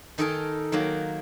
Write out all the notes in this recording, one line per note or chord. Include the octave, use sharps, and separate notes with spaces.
D#3 D#4 A4 A#4 D#5 G#5
D#3 F#3 A#3